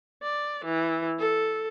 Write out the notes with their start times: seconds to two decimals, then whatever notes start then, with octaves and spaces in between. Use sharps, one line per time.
0.23 D5
0.65 E3
1.19 A4